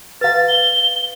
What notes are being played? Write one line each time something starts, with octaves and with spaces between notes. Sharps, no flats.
B4 F5 A6
G7